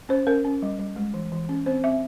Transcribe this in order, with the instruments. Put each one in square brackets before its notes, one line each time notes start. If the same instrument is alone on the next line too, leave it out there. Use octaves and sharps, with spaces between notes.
[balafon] C#4 C5
C#4 A#4
C#4
G3
G3
G#3
E3
E3
C#4
C4 C5
C4 E5